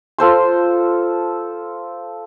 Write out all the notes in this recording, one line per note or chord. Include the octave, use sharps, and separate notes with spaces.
F4 A4 C5 C6